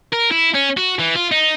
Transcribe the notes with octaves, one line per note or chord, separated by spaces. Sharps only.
A#4
E4
C#4
F#4
E3
F4
D#4